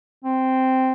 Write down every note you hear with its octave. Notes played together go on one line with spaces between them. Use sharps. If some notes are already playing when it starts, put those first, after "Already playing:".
C4